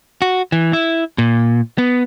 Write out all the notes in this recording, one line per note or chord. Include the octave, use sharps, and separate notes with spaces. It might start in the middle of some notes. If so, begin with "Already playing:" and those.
F#4
E3
E4
A#2
B3